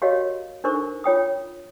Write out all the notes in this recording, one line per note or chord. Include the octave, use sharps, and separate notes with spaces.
F#4 G4 A#4 C#5 D#5 F5
D4 D#4 A4 A#4 C5 C#6
F4 C#5 G5 D#6